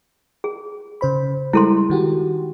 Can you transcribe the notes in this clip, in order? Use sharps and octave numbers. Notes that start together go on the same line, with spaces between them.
G#4
C#3 C5 B5
G3 G#3 E4 A4 C6
D#3 F#4 G4